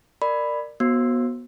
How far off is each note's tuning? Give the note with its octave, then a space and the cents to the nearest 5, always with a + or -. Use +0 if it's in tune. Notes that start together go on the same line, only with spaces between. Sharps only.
A#4 -10 D5 +20 B5 +5
B3 -20 F#4 +0 C5 +35